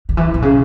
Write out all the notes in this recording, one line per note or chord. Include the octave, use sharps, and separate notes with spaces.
D3
E3
B2
C#3